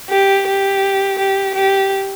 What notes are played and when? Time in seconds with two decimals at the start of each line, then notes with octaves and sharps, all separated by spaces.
0.10 G4
0.47 G4
1.19 G4
1.55 G4